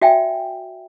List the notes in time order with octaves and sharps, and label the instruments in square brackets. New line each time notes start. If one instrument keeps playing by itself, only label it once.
[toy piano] F#4 D5 E5 G5 G#5